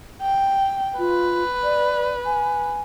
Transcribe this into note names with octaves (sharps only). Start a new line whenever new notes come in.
G5
F4 B4
D5
G#5